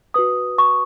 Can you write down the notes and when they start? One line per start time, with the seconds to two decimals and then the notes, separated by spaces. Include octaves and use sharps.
0.14 F#4 B4 D#6
0.58 C#6